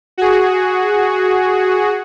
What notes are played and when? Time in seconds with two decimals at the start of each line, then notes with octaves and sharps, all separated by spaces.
0.18 F#4 G#4